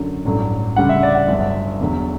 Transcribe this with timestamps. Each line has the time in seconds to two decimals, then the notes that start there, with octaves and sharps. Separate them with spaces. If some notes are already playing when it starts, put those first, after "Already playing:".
Already playing: F#2 D3 F#3
0.25 A1 G2 F#3 A3
0.76 D2 C#3 G3 F#5
0.89 E5
1.03 D5
1.15 F#5
1.28 G1 G2 F#3 E5
1.80 E2 D3 F#3